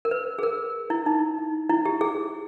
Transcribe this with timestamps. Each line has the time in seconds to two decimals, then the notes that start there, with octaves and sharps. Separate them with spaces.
0.05 A#4
0.11 B4
0.39 G#4
0.43 A#4
0.90 E4
1.06 D#4
1.39 D#4
1.70 E4
1.86 G4
2.01 G#4